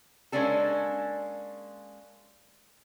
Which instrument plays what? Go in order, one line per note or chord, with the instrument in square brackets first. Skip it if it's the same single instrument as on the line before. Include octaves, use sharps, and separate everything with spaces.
[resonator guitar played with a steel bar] G#3 A#3 C#4 D4 A4